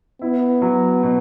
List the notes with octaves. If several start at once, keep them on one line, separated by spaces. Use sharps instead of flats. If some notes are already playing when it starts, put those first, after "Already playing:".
B3 E4
F#3
B2